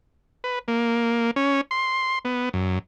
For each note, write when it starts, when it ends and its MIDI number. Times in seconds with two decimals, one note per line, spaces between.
0.44 0.59 71
0.68 1.31 58
1.36 1.61 61
1.71 2.19 84
2.25 2.49 59
2.54 2.79 42